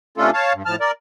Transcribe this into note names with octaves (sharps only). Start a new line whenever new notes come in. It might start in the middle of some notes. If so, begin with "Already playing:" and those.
C3 A3 C#4 D4 F4 A4
C#5 F5 A5
G2
A2 F3 A5 F6
A#4 D5